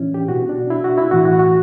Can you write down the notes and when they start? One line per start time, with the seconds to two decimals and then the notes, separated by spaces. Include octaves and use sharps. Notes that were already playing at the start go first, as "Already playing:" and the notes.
Already playing: A2 E3 C#4 D4 E4
0.14 G4
0.28 B2 F#4
0.49 D4
0.70 E4
0.84 F#4
0.98 E4
1.11 A2 E3 F#4
1.25 F#4
1.39 F#4